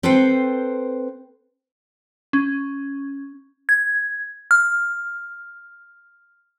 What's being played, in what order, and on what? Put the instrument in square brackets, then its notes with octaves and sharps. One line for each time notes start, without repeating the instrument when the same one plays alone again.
[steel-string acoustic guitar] C4 A4 B4 C5 G5
[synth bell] C#4
G#6
F6